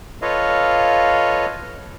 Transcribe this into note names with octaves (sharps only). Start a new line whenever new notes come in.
F4 A4 B4 C#5 D#5 F5